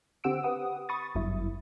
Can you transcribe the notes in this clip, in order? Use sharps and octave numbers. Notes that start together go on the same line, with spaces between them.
D3 C4 G4 F#5 E6 D7
G4 B4 F#5 D#6
B5 C#6 D#6 A6
G1 F#2 E4